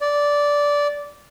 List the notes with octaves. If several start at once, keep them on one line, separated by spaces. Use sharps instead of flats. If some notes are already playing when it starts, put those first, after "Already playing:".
D5